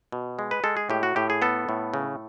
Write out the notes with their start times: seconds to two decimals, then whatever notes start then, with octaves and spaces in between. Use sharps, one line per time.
0.12 B2
0.39 G#3
0.51 B4
0.64 G#3 A4
0.77 G#4
0.90 A2 G4
1.03 F#4
1.16 A2 G4
1.30 G#4
1.42 B3 A4
1.69 A2
1.94 C#3